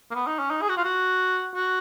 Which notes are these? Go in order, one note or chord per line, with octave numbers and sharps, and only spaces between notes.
A#3
B3
D#4
C#4
D#4
G#4
F#4
F4
F#4
F#4